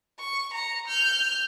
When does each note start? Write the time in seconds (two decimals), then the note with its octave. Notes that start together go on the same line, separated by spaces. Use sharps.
0.20 C#6
0.54 A#5 C#7
0.87 F6 G6